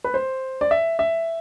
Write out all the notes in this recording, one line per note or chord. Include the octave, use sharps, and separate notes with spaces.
B4
C5
D5
E5
E5